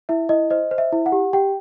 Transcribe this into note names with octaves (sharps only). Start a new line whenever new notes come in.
E4 E5
E4 D#5
C5 D#5
C5
E5
E4
F#5
G4
G4 G5